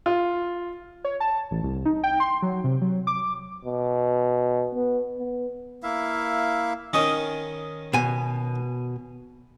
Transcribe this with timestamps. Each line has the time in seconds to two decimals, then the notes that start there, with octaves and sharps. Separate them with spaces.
0.06 F4
1.04 C#5
1.20 A5
1.51 A1
1.63 C2
1.85 D#4
2.04 G5
2.20 C6
2.42 F#3
2.64 C3
2.82 F#3
3.07 D6
3.65 B2
4.75 B3
5.19 B3
5.83 A#3 E4 E5 F5
6.93 D#3 C#4 D#5
7.93 B2 G#5